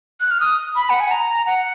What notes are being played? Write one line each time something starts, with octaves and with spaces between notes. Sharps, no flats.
F#6
F6
D#6
B5
F#5
G#5
A#5
F#5